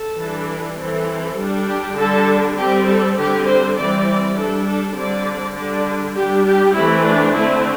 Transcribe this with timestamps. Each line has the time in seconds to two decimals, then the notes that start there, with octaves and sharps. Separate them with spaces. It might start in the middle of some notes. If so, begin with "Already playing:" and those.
Already playing: A4
0.18 E3 G3 D4
0.77 E3 C4 A4
1.37 G3 D4
1.67 G4
1.97 D3 G3 D4 A4
2.57 G3 C4 G4
2.87 A4
3.16 D3 G3 C4 G4
3.47 C5
3.76 E3 G3 C4 D5
4.06 D5
4.36 G3 D4 A4
4.66 A4
4.95 D3 G3 C4 D5
5.55 D3 G3 D4 D5
6.15 G3 D4 G4
6.45 G4
6.74 E3 A3 C4 E4
7.04 D4
7.34 D3 A3 C4 E4